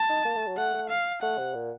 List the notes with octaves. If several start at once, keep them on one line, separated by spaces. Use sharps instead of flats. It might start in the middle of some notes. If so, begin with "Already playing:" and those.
Already playing: A5
D#4
A#3
A3
F#3
A3 F#5
A3
F5
A3 F#5
C3
A#2